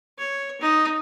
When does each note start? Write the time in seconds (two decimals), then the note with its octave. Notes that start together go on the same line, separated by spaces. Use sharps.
0.19 C#5
0.61 D#4